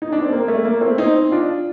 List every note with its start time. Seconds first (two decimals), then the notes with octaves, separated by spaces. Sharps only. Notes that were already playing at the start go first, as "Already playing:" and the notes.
0.02 D#4
0.12 D4
0.22 C4
0.32 A#3
0.48 A3
0.65 A#3
0.81 A3 C4
0.98 C4 D#4
1.31 D4 F4